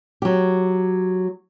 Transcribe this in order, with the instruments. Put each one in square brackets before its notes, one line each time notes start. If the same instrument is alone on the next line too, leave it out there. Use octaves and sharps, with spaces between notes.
[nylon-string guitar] F#3 G4